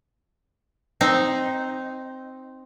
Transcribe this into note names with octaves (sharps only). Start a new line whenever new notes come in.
C4 D#4